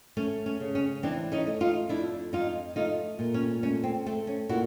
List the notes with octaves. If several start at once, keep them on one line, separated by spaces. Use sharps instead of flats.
A3 C#4
C#4
C#3
C#4
E3 C4 D4
C#4 D#4
A3
D#4 F4
F2 D4 E4
F2 D#4 F4
A3 D#4 F4
A#2
C#4
A3 C#4
C4
A3 C4
C#4
A#2 E4 F#4